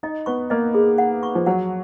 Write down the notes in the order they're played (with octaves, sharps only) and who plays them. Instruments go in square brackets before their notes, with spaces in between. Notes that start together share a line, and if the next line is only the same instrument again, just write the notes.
[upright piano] D#4 [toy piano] D#5
[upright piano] B3 [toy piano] C#6
[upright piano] A#3 [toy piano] D#5
[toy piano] G#4
F#5
C#6
[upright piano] F3
[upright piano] F#3 [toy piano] F#5